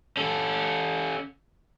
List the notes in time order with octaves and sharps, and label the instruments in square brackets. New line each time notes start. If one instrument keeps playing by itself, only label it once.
[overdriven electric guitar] C#4 A4